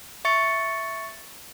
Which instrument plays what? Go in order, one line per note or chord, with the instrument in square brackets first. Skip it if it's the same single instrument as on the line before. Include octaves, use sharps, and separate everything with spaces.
[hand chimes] E5 C#6 A6 C#7